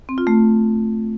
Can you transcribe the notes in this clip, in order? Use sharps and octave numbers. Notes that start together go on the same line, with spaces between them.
C4
F4
A3